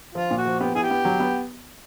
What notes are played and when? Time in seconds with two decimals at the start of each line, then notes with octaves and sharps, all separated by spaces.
0.15 F3 F4
0.31 A#2
0.38 F#4
0.45 F3
0.60 B3 G4
0.74 E4 G#4
0.83 G4
0.90 B3
1.05 F#3
1.20 B3